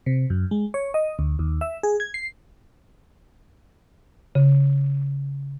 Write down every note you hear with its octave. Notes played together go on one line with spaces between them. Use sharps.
C3
F#2
G#3
C#5
D#5
D2
D#2
E5
G#4
G#6
C7
C#3